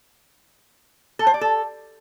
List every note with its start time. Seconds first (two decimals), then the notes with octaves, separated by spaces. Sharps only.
1.19 A4
1.27 C5
1.34 D5
1.41 A4